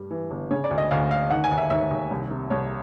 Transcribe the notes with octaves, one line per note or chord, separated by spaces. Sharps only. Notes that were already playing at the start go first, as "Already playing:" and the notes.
Already playing: G2 G3
E3
G1
C#3 C#5
D5
D2
D#5
D2 F5
D2 F5
D#3 F#5
G#5
D#2
E5
D#2 E5
D#2
C2
C3
C2 C#5